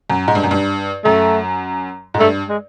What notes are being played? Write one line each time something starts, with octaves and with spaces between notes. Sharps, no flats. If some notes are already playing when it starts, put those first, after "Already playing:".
F#2
G#2
G2
F#2
G2
F#2 A3
G#2
G2 A3
G#3